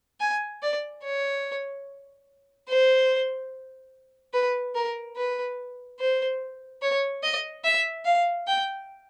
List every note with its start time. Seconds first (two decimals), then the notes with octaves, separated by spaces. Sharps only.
0.20 G#5
0.62 D5
1.03 C#5
2.68 C5
4.33 B4
4.75 A#4
5.16 B4
5.99 C5
6.81 C#5
7.23 D#5
7.64 E5
8.05 F5
8.47 G5